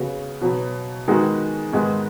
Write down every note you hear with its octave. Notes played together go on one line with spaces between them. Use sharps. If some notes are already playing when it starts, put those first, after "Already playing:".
Already playing: C#3 B3 F#4
B2 F#3 B3
D#3 G#3 B3 F#4
G#2 D#3 G#3 B3